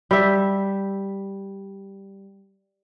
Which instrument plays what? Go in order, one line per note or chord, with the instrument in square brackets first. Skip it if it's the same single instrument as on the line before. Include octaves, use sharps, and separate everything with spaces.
[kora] G3 E5